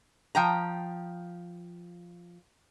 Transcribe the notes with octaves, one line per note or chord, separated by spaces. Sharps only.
F3 G5 A#5